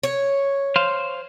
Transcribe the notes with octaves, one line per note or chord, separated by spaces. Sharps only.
C#5
C5 F5